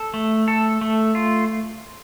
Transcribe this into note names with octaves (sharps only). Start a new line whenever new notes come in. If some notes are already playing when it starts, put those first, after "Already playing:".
Already playing: A4
A3
A4
A3
F4